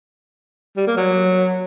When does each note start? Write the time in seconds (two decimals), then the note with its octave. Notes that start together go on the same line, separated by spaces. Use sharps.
0.77 G3
0.87 A#3
0.97 F#3